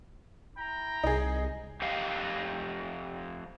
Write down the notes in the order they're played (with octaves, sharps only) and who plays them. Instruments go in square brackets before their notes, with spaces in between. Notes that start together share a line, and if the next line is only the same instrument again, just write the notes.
[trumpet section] E4 G5 A#5
[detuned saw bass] C2 [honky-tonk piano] D#4 G#4
[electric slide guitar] F2 G4 D#5 F5